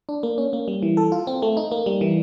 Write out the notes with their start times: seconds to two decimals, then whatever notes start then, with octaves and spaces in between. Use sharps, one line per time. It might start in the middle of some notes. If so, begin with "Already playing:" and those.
0.09 D4
0.23 A#3
0.38 C#4
0.53 A#3
0.68 G3
0.82 E3
0.97 A4
1.12 F4
1.27 C4
1.42 A3
1.57 D#4
1.72 A#3
1.86 G3
2.01 E3